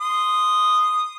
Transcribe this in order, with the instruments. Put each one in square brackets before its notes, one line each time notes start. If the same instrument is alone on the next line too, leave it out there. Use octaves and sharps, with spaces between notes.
[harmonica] C6 D#6